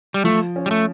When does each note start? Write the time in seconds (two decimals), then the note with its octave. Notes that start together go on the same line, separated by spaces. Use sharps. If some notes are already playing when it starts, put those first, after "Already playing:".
0.14 G3
0.24 F3 A3
0.56 C#4
0.66 G3
0.71 A3